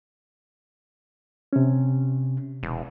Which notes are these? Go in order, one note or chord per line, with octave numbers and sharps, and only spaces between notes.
C3 C#4
E1